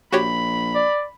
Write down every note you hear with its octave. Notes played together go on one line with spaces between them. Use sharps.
A#1 F#4 G4 C#5 B5
D5